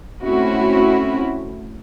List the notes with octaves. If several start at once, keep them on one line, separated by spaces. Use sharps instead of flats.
A3 C4 C#4 E4 F#4